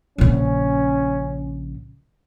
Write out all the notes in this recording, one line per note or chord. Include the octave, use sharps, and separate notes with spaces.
A#1 C#3 C#4